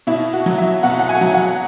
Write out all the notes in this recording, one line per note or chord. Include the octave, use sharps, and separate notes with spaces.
B2 E4
F#4
F#3
E5
B2 F#5
F#5
G#5
F#3
F#5